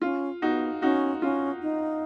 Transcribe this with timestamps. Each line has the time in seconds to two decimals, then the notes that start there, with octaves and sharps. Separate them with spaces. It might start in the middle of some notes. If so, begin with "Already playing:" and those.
0.02 C#4 F4
0.42 B3 D#4 F#4
0.82 C#4 D#4 F#4
1.22 C#4 F4
1.62 D#4